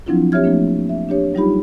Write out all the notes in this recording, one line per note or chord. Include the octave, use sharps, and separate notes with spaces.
F3 F#3 C4 D4 E4 F4
C4 G4 C#5 E5 F6 G#6
F3 A3 A#3 D4
E5
D4 G4 C#5
F#3 G3 D#4 F4 G4 B5